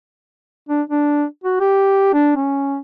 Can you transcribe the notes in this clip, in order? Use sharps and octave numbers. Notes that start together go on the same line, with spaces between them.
D4
D4
F#4
G4
D4
C#4